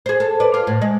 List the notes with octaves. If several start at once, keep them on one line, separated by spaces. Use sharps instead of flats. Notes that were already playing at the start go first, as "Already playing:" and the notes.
G#4 C5
A4
B4 D5
F4
A2
G#3